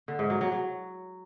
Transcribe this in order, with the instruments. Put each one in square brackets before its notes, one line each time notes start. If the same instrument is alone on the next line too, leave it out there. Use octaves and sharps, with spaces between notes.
[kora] D3
G#2
F#3
F#3
F#3